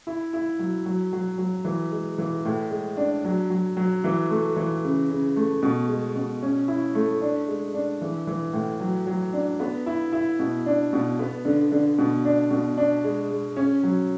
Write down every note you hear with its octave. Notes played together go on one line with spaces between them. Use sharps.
E4
E4
F#3
F#3
F#3
F#3
E3
G#3
E3
A2
G#3
D4
F#3
F#3
F#3
E3
A3
E3
C#3
C#3
A3
B2
G#3
B2
C#4
E4
A3
D4
G#3
D4
E3
E3
A2
F#3
F#3
D4
B3
E4
E4
B2
D4
B2
B3
D3
D3
B2
D4
B2
D4
G#3
G#3
C#4
F#3